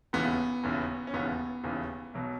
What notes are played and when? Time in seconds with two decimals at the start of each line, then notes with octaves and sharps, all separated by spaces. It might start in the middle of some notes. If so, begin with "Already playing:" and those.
0.13 E1 D#2 C#3 E3 B3
0.63 E1 D#2 C#3 E3
1.07 C#4
1.14 E1 D#2 C#3 E3 B3
1.64 E1 D#2 C#3 E3
2.14 B1 B2 F#3